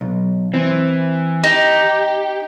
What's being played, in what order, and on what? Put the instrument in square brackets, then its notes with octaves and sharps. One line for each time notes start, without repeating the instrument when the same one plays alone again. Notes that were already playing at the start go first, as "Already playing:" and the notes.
[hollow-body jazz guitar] B1
[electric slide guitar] E3 [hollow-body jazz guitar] C4
[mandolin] D#4 [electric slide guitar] G4